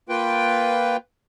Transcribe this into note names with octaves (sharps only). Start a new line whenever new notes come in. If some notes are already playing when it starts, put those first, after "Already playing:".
A#3 F4 B4 G5